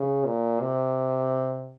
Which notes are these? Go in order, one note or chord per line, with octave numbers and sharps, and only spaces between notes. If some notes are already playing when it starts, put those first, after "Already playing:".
Already playing: C#3
A#2
C3